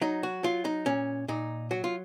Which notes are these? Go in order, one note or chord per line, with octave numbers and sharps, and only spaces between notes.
F#3 D#4
F#4
F#3 F4
D#4
A#2 C#4
A#2 D#4
F#3 F#4
F4